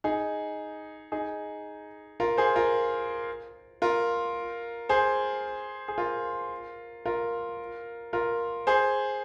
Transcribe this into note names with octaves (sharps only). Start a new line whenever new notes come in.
D#4 G#4
D#4 G#4
F4 A#4
G#4 C5
F4 A#4
F4 A#4
G#4 C5
G#4
F4 A#4
F4 A#4
F4 A#4
G#4 C5